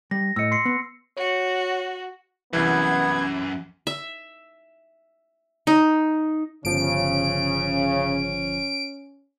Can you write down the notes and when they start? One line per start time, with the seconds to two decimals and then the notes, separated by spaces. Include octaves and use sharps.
0.11 G3 A#6
0.36 A2 D#5 E6 C#7
0.51 C6 C7 C#7
0.65 B3
1.17 F#4 C#5 C#7
2.53 C2 F#2 E3 B3 G#6
3.87 E5
5.67 D#4
6.65 G1 C#3 F3 C#4 D7